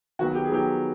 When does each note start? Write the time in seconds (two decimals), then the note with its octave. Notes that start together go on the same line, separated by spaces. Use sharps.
0.19 D#3 F#3 B3 F#4
0.35 G4
0.44 G#4
0.50 D#3 F#3 B3 G4